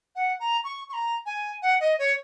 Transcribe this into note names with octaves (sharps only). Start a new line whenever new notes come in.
F#5
A#5
C#6
C#6
A#5
G#5
F#5
D#5
C#5